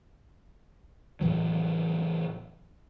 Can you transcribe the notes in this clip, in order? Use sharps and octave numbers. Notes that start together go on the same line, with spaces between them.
A2 C#3 E3 F#3